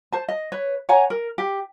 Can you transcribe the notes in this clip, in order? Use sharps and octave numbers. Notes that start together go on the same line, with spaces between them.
C5 A5
D#5
B4 C#5
C#5 F#5 G#5 A#5
A#4
G4